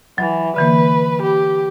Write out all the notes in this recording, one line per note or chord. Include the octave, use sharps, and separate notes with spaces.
E3 F#3
D3 E3 A#3 B4
G4